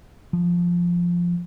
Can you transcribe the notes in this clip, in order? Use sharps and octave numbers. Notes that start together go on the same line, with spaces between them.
F3